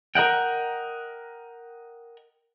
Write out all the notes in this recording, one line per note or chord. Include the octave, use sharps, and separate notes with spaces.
A#4 D#5 F#5 G5